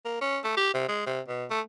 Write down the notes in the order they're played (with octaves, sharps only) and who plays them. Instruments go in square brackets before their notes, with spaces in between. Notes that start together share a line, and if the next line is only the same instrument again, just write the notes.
[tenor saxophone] A#3
C#4
A3
G4
C3
G#3
C3
B2
A3